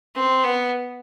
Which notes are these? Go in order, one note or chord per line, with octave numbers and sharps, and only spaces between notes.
C4
B3